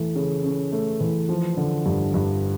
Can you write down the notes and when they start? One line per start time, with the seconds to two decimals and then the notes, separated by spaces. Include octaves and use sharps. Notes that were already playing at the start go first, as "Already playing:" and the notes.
Already playing: E3 A3
0.15 C#3
0.44 C#4
0.72 A3
1.01 E3
1.29 F3
1.57 D3
1.86 G2
2.14 G2